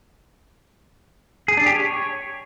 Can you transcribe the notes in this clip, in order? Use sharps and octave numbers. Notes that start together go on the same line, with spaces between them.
G#4
D4
G4
C#5